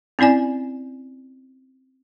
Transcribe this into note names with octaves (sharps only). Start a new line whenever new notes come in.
C4 C#4 E4 D5 G#5